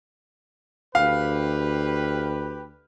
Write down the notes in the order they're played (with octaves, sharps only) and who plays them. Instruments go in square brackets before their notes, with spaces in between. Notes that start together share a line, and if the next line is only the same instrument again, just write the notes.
[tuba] D2 [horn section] G4 B4 [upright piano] F5